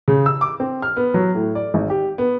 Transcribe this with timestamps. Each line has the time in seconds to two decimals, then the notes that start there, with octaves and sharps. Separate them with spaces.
0.08 C#3
0.26 E6
0.41 D6
0.60 C4
0.82 F6
0.97 B3
1.14 F#3
1.35 A2
1.55 D5
1.74 G#1
1.90 G4
2.18 B3